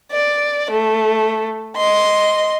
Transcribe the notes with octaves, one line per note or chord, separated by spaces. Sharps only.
D5
A3
D#5 C6